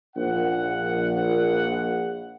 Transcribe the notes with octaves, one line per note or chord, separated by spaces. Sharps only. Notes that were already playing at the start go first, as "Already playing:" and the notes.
A#1 F#5